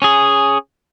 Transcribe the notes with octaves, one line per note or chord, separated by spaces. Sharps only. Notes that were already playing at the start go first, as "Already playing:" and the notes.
C#4 G#4